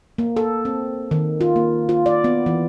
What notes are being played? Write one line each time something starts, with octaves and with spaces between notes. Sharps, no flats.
A#3
A4
C4
D#3
F4
A#3
F4
D5
B3
E3